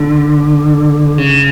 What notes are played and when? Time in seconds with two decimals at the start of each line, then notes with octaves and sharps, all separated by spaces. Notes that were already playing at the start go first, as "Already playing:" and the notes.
Already playing: D3
1.18 C#3